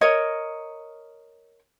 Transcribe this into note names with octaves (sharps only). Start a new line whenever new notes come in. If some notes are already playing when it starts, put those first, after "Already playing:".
A#4 C#5 D#5